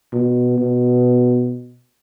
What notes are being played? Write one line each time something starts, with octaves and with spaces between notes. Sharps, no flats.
B2
B2